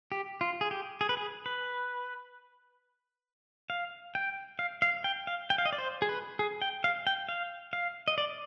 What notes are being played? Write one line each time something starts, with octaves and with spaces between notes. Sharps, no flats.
G4
F4
G#4
G4
G#4
B4
G#4
B4
F5
G5
F5
F5
G5
F5
G5
F5
D#5
D5
C5
G#4
B4
G#4
G5
F5
G5
F5
F5
D#5
D5